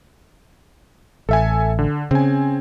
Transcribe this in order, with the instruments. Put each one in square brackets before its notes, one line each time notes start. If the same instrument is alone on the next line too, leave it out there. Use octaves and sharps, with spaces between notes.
[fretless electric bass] A1 [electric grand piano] A4 E5 G#5
[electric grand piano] D3
[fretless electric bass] C#3 [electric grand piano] C4 G#5